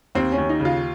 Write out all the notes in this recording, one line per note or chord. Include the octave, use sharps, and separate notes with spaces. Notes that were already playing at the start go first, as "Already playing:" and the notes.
D#2 C4
C#4
D#2
D#4
C#3
F4